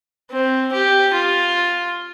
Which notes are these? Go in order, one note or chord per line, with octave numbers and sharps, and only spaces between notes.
C4
G4
F4